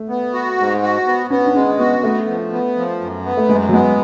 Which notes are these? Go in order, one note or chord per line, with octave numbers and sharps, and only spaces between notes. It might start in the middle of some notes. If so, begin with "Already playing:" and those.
Already playing: A3
B3
F#4
G#2
F#4
B3
B3 C#4
D4
G#3 C#4
B3 F#4
A3 B3
F3
B3
F3
F#2
B3
A3
F#2 G#3
F#3
G#3 B3